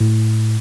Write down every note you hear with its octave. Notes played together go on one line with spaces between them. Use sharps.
A2